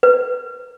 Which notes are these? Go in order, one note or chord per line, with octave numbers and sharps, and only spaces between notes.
B4